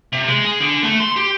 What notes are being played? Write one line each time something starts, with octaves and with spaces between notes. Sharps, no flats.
C3
G#3
G#4
D3
A3
C6
G4